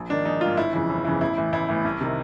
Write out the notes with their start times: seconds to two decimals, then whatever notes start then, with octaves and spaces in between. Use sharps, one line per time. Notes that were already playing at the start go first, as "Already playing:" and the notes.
Already playing: A#1
0.09 G#2 D#3 D4
0.25 A#1 D#4
0.41 G#2 D#3 F4
0.57 G1 E4
0.73 F2 C#3 E3
0.89 G1
1.05 F2 C#3 E3
1.21 A1 E4
1.37 A2 E3
1.53 A1 E4
1.69 A2 E3
1.85 C2
2.01 C3 D#3